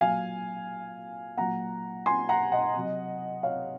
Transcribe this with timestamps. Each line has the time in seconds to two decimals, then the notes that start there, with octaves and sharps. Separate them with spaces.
0.01 A#2 F#3 F5 G#5
1.37 A#2 F#3 F#5 A#5
2.06 G#5 C6
2.29 F#5 A#5
2.52 D#5 F#5
2.75 C3 F#3
3.43 C#5 F5